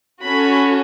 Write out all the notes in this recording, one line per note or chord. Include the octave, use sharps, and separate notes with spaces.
C#4 F#4 A4 B5